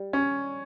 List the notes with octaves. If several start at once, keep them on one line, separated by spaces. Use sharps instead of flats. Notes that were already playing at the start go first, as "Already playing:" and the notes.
Already playing: G3
C#4